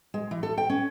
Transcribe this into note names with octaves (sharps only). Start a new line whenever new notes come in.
G#3
E3
A4
G5
C#4